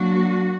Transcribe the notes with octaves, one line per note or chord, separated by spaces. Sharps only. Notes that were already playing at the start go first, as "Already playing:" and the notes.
Already playing: F#3 A#3 D4 F#4